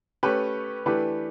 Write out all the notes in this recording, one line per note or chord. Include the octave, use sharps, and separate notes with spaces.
A3 C#4 G4 B4
E3 A3 D4 G4 B4